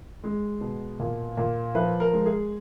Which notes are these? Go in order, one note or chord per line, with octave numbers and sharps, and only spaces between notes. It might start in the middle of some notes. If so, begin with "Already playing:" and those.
G#3
B2
A#2
A#2
F3 B4
A#4
G#3
G#4